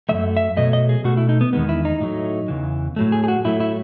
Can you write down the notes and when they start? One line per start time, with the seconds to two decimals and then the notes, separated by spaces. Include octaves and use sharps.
0.09 F#2 E3 A3 E5
0.37 E5
0.57 B2 F#3 A3 D#5
0.73 D#5
0.89 G#4
1.04 B2 A3 F#4
1.17 E4
1.29 D#4
1.41 B3
1.53 E2 D#3 G#3 B3
1.69 E4
1.85 D#4
2.00 A2 F#3 A3
2.48 E2 C#3 E3
2.96 A2 F#3 A3
3.12 G#4
3.24 G#4
3.28 F#4
3.45 A2 F#3 A3 E4
3.60 E4